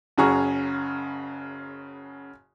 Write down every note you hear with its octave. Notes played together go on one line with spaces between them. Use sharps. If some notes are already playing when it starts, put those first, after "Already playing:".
F#1 C#3 F#4 G#4 A#5 C#6